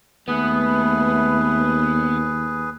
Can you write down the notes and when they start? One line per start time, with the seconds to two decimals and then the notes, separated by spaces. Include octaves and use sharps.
0.28 D#2 A3 B3 G#4 B4